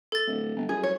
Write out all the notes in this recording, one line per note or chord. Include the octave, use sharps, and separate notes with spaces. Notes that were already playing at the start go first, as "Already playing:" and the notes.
A4 A6
D1
G1
F#2 G#4
C#5